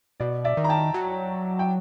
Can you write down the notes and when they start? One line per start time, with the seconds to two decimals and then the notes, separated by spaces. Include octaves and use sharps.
0.20 B2 D5
0.44 D5 E5
0.57 D#3
0.64 A#5
0.69 G5 A5
0.94 F#3
1.59 G5